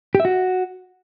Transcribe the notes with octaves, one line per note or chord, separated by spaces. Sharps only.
G4
E5
F#4